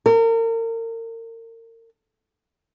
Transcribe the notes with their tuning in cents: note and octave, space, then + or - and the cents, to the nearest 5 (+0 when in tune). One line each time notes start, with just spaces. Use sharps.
A#4 -35